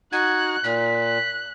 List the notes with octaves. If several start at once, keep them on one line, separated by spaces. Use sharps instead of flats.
D#4 F#4 F#5 F#6 G#6
A#2 B6
F#6